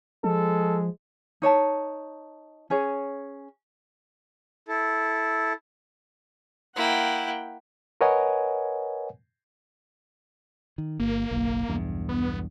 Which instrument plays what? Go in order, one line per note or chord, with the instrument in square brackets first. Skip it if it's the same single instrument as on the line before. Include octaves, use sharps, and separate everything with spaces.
[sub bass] F3 [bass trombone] G#3 [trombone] A4
[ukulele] D#4 C#5 D5 A5
C#4 G#4 C#5
[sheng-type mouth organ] E4 A4
[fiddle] A#3 E4 [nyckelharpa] F#5 G5
[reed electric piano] A#4 B4 C#5 D#5 F#5 G#5
[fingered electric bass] D#3
[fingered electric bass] G1 [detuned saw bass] A#3
[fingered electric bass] F#1 B1
B1 E2 G2
[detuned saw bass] B3